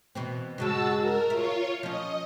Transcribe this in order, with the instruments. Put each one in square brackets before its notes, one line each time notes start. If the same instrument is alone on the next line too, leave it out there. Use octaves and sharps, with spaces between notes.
[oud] B2 E3 C4
[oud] G2 C#3 G#3 [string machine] F#4 A5 E6
[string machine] A#4
[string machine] F4 C#5 [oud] E5
[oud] F3 C#4 [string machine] D#5